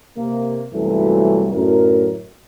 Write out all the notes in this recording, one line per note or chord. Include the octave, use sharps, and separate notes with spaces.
C3 A#3
C2 F#2 A#2 E3 F#3 A3
F#2 A2 D3 A#4